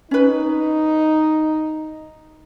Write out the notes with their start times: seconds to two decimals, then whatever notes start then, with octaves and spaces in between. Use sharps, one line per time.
0.11 C#4 D#4 B4